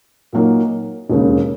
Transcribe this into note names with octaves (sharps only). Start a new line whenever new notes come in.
A#2 F#3 A#3 D#4
E1 D#2 C#3